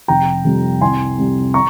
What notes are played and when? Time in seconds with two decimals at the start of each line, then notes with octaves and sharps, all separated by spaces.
0.08 F1 G5 A#5
0.45 F2 C3 G3
0.81 C2 G#5 C6
1.18 C3 G3
1.54 A#5 C#6